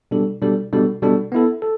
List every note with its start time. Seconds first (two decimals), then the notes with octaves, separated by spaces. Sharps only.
0.11 B2 G3 D4 A4
0.42 B2 G3 D4 A4
0.73 B2 G3 D4 A4
1.02 B2 G3 D4 A4
1.32 B3 E4 A4
1.62 A4